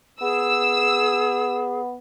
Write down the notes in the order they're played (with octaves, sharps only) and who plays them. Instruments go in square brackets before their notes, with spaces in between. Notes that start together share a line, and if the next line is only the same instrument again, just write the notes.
[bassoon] B3 [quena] G#4 [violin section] E6